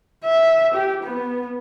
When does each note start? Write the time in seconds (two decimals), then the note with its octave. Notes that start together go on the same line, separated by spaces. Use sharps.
0.25 E5
0.74 G4
1.04 B3